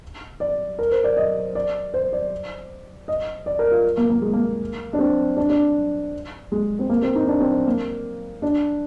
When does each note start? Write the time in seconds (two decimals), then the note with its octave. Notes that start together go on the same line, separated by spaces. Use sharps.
0.40 D5
0.79 A#4
0.91 C5
1.04 D5
1.17 D#5
1.55 D5
1.94 C5
2.13 D5
3.08 D#5
3.46 D5
3.59 A#4
3.72 F4
3.97 A#3
4.10 A#3
4.22 G#3
4.33 A#3
4.93 D4
4.99 C4
5.36 D4
5.50 D4
6.52 G#3
6.79 C4
6.90 A#3
7.02 C4
7.15 D#4
7.27 D4
7.40 C4
7.66 A#3
8.42 D4